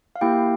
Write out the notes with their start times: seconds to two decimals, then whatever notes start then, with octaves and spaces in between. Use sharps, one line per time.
0.16 F5
0.21 A#3 E4 G4 G5